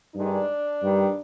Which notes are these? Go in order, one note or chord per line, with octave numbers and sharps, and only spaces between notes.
G2 D#3 G#3 D4
G2 D#3 G3